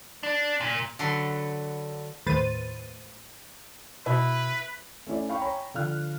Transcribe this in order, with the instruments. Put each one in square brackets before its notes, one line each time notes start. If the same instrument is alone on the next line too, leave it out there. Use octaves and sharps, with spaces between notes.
[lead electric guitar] D4
A#2
[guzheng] D3 F#3 A4 B4 C6
[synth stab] D#2 A2 B4 C5 A6 D#7
[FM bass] B2 [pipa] E4 [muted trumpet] B4
[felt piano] A3 C#4 E4 D5
F5 G5 B5 C#6
C#5 G5 G#5 A#5 B5 C#6
D3 F3 F5 F6 F#6